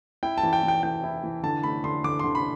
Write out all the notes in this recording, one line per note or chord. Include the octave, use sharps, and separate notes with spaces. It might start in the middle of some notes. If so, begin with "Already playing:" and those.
E4 G5
A5
E3
G5
E3
G5
E3 G5
E4
E3
D3 A5
A3 B5
D3 C6
D3 D6
D3 C6
B5